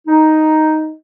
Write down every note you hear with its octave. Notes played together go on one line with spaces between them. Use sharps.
D#4